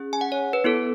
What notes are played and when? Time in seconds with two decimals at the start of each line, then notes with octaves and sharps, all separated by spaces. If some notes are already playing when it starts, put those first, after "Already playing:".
Already playing: C#4 G#4
0.13 G#5
0.21 F#5
0.32 C#5
0.53 B4
0.64 B3 E4 A4